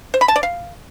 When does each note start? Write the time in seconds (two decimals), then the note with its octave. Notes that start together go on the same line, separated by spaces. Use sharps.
0.14 C5
0.21 B5
0.28 A5
0.36 D5
0.43 F5